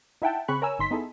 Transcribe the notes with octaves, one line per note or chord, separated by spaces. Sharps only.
D#4 E4 E5 F#5 G5 A5
C#3 C4 G#4 B5 C#6 F#6
A#4 C#5 G#5 E6
G1 D#4 C6 B6
B3 D#4 E4 G#4 A4